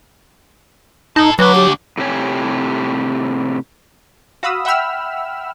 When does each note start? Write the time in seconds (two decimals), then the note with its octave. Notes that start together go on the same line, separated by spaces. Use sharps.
1.16 D#4 E4 A5
1.39 D2 F#3 D4 B4
1.55 G4
1.98 A2 C3 G4 C#5 G#5
4.43 F#4 F5 B5 D#6 E6
4.65 E5 F#5 G5 B5 E6 F6